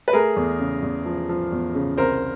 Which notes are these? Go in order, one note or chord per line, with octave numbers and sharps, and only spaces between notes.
B4
A3 G#4 A#4
E2
C#3
E2
F3
F3
E2
C#3
C2 A#4 C5